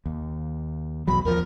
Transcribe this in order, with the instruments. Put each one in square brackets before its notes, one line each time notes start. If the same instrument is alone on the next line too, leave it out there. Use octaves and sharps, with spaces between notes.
[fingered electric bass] D#2
[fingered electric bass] B1 E2 F#3 [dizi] B5
[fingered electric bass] D#2 F3 [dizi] A#4